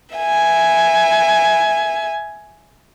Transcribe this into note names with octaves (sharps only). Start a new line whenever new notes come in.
E5 G#5